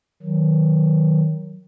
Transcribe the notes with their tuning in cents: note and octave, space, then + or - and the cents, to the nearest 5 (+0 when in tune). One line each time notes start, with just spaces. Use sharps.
D#3 +10 F#3 +0